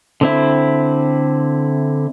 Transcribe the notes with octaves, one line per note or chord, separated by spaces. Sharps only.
D3 C4 E4